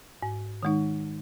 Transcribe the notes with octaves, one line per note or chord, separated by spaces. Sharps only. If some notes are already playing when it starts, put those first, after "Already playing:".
G#2
D#3 G#3 D#4